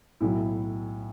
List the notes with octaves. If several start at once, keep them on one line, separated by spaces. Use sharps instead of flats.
B1 A2 F#3 E4